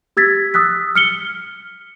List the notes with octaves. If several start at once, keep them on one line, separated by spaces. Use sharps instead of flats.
G4 E6 G#6 A6 B6
D#6 E6 F#6 B6
F6 C#7 G7